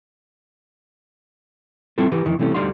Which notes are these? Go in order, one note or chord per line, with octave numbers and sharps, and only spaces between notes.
G3 C4 E4 F4 A4
E3 G4 A#4 B4
F2 D#3 E3
C3 E3 G3 A3 C4 C#4
D2 D3 G3 D#4 F5 C6